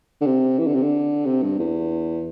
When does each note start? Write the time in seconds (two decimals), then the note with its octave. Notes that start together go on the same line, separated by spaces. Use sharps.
0.21 D3
0.26 C3
0.59 E3
0.67 D3
0.75 C3
0.83 D3
1.26 C3
1.42 G2
1.59 E2